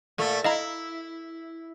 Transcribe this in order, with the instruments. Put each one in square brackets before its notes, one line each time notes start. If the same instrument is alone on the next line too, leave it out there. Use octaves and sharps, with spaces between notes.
[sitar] A#2 A3
[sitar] E4 [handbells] D#5 F5 A#5